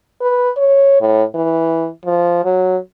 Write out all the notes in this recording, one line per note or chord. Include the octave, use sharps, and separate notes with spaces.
B4
C#5
A2
E3
F3
F#3